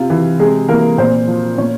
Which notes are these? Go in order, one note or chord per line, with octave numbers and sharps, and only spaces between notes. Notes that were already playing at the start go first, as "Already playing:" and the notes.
Already playing: C3 F4
E3
C3 G#3 G#4
E3 A#3 A#4
A#2 C4 C5
F3
A#2 C#4 C#5